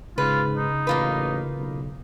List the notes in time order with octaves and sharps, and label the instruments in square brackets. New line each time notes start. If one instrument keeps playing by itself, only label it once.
[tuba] G#2 [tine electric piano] C#3 [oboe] F4 [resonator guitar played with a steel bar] B4
[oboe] D#4
[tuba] A1 [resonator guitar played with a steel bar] A#3 F4 B4
[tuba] B1